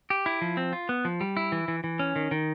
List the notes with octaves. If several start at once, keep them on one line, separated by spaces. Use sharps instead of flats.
G4
E4
F3
C4
F4
B3
F3
G3
E4
E3
E3
E3
C#4
D#3
D#3